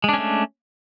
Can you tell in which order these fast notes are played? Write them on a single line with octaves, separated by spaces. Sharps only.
G#3 D4 C#4 A3